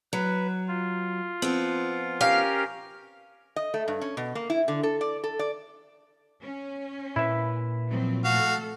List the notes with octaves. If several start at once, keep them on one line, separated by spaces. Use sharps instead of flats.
F#3 B4
F4
F3 B3 C4
C#4 G4 A#4 F5
D#5
A3
G2
C#4
B2
A#3
E4
D3
A4
D5
A4
D5
C#4
A#2 E4 B4 E5
F3 F#3 C4
A3 F#4 A4 F5